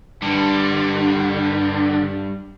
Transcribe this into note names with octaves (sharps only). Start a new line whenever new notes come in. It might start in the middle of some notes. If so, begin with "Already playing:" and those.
G2 D3 G3